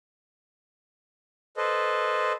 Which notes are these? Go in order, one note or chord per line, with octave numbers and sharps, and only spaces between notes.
A4 B4 C5 D#5